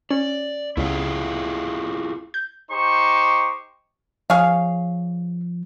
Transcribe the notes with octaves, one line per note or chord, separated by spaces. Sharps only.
C#4 D5
C#2 E4 F4 G#4
G6
D#4 G4 C5 C#6
F3 G#4 C#5 F5